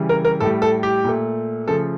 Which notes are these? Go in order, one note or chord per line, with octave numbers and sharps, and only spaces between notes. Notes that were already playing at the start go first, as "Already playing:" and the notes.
Already playing: C#3 E3 G3
A#4
A#4
A2 G3 A4
A4
G4
A#2 A3
C#3 F3 A3 A4